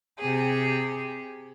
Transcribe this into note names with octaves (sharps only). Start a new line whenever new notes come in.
C3 G4 G#4